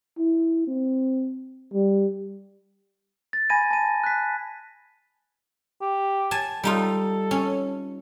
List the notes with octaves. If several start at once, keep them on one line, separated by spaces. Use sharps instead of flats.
E4
C4
G3
A6
G#5 B5 G#6 A#6 D#7
A5 D#7
F#6 B6
G4
G#5 A5
G3 D#4 F4 A4
C#4